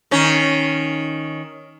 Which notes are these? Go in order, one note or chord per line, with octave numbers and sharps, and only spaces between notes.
D#3 C#4